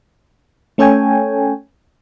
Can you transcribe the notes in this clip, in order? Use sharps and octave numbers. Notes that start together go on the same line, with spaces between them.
A3 C#4 A4 C#5 G5 G#5